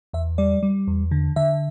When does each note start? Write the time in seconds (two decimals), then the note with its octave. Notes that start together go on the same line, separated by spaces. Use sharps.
0.13 E2 E5
0.38 G3 D5
0.63 G3
0.87 E2
1.11 D3
1.36 D3 E5